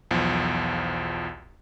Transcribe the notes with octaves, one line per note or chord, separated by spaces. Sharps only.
B1 E2 F3